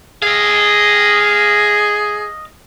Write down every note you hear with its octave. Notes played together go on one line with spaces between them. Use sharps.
G#4 D#5 F5